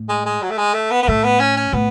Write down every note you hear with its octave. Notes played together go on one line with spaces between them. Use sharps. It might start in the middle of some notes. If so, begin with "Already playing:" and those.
Already playing: A2
G#3
G#3
F#3
A3
G#3
A3
B3
B3
A2 A3
B3
C#4
C#4
A2 B3